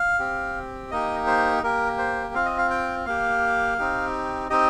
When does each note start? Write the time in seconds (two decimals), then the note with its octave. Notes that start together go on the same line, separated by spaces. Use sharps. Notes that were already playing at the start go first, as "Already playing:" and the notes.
Already playing: F5
0.19 C4 G4
0.91 A#3 D#4 G4 D#5
1.27 C5
1.63 A#3 G4 A#4
1.98 C5
2.34 C4 F4 F5
2.45 D#5
2.58 F5
2.70 G5
3.06 A#3 G4 F5
3.78 C4 D#4 G4
4.50 C4 D#4 G4 D#5